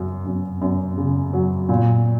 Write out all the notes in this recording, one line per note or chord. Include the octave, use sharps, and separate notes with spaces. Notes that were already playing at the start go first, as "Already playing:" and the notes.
Already playing: F#2 C#3 F#3
F#2
F#2
C#3
F#3
A#2